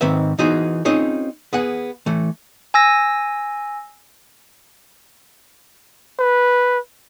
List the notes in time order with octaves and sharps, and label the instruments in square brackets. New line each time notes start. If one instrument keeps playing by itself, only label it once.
[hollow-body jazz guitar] G#2 D#3 C4 B4 E5
E3 B3 D#4 F#4 G#4 C5
C4 C#4 D#4 F4 G#4 C#5
B3 G#4 F#5
E3 A3
[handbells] G#5 E6 A#6
[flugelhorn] B4